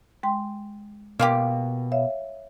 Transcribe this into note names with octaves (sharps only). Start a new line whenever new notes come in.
G#3 G5 C6
B2 A#3 F4 G4
C#5 E5 F5